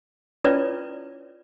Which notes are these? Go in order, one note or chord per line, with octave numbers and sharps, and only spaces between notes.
C#4 E4 F4 B4 C#5 D5